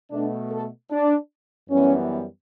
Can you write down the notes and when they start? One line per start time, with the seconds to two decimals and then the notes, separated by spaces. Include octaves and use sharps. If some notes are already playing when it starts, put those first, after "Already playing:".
0.11 B2 A3 D4
0.51 A4
0.91 D4
1.69 F#2 E3 G3 B3 C#4